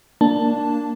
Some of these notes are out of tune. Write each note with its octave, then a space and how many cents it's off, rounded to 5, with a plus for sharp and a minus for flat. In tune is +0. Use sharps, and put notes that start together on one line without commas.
A#3 +0 D4 +0 A5 +0